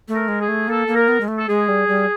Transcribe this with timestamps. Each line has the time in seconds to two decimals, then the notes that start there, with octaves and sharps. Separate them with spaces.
0.08 A3
0.15 A#4
0.28 G#3
0.41 G#4
0.48 A3
0.68 A#3 A4
0.88 A#3
0.95 A#4
1.08 B3
1.21 G#3
1.28 A3
1.38 A4
1.48 G#3 G#4
1.68 G3
1.88 G3